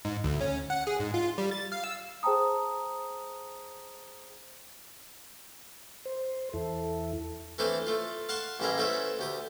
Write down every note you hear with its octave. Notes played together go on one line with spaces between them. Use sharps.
G#2
D2
C#4
F#5
G#4
G#2
F4
G3
A6
F5
E6
G#4 C5 G5 A5 A#5 D#6
C5
E2 E4 A4
E3 A3 C4 D4 C5 F5
A3 F4
F5 F#5 A5 C6 C#6
A1 G3 E4 G#4 A#4 D#5
A3 B3 C#4 C5 E5
D2 G4 D#6